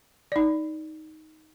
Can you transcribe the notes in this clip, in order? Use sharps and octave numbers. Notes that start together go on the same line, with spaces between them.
D#4 D5